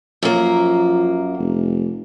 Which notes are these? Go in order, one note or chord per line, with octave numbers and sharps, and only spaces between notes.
F#2 F3 A#3
F1